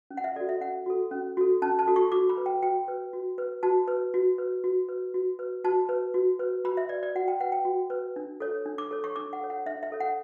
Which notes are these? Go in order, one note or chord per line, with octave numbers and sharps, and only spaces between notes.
C#4
F#5
E5
F#4 A4 D5
E5
C#4 F#5
F#4 A4
C#4
F#4 A4
C#4 A5
A5
F#4 A4
C#6
F#4 D6
B5
B4
G5
F#4 G5
B4
F#4
B4
F#4 A5
B4
F#4
B4
F#4
B4
F#4
B4
F#4 A5
B4
F#4
B4
F#4 B5
E5
B4 D5
D5
F#4 F#5
G5
B4 F#5
G5
F#4
B4
D4
A4 C#5
D4
D6
A4 C#5
C#6
D4 D6
F#5
A4 C#5
F#5
D4 E5
E5
A4 C#5
F#5